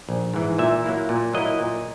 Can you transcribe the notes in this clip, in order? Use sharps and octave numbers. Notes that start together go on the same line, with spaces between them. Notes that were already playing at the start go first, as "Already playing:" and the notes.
A#1
G#2 E3
A#2 E5
F#3 A#3 E4
A#2
F#3 A#3 E4 D#5
A#2